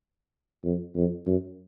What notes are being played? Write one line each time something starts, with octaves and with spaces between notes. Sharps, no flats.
F2
F2
F#2